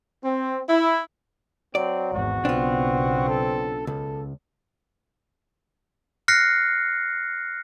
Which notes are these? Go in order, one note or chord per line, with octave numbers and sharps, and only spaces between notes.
C4
E4
F#3 C4 D5
G#1 E2 F#4
B1 C#3 B3 C4 D4 F4
A4
C#2 A4
F6 F#6 A#6 C7 C#7